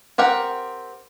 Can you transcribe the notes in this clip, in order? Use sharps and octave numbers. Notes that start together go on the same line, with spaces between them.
C4 G4 A#4 F#5